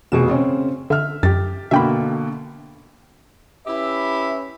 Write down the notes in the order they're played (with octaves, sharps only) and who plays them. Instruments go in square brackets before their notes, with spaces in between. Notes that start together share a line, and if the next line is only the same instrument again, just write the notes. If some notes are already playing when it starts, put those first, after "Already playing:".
[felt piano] F1 B2 G#4 [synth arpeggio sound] E7
[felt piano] C#3 C4 C#4
[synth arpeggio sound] D3 [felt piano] E5 F6
[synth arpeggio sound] F#2 [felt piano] G4 A6
[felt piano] B2 D3 A#3 [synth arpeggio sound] E5 G5 B5
[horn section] C#4 E4 G4 B4 E5